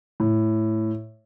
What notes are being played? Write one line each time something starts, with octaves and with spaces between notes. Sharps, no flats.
A2